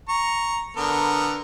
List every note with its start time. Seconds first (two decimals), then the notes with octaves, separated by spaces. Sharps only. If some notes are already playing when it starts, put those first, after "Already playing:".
0.09 A#5 C#6
0.77 D3 B3 A#4